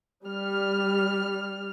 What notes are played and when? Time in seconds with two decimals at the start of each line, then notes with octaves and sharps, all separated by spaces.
0.24 G3 F6